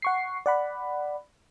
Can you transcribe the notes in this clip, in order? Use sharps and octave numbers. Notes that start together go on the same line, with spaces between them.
F#5 C#6 C7
D5 F#5 B5